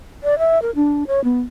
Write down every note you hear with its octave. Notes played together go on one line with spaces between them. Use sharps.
D5
E5
A#4
D4
C#5
B3